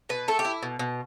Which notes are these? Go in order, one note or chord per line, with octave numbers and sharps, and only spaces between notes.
B2 B4
A3 A4
G4
E4
B2
B2